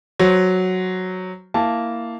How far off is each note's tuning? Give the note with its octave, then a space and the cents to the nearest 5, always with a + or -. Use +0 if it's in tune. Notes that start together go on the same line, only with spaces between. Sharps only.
F#3 +0 C5 +0
A#3 -5 E4 +0 A5 +0